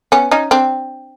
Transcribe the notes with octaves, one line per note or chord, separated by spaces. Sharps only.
B3 C#4
C#4 D#4
C4 D4